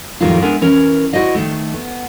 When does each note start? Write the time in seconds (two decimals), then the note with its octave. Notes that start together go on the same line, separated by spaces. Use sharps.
0.21 F2 A2 D#3 F#3 G3 F4
0.42 G#3 B3 D4 A#4 E5 G#5
0.61 E3 C#4 A#4
1.13 E4 F#4 C5 D5 D#5 F5
1.35 D#3 A3
1.74 B3